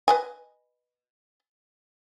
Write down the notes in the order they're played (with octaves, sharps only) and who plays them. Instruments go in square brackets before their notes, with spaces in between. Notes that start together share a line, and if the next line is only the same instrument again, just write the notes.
[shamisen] B4 D#5 G#5